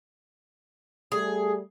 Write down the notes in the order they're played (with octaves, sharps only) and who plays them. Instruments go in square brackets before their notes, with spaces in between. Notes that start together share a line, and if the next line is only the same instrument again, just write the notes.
[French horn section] G3 A3 [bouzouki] G#4